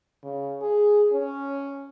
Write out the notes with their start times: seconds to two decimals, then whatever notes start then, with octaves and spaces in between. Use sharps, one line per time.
0.23 C#3
0.62 G#4
1.13 C#4